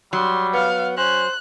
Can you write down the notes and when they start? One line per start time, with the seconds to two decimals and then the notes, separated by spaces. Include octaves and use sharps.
0.13 F#3 G3 C6
0.54 B3 F5
0.97 C#4 C5 F#6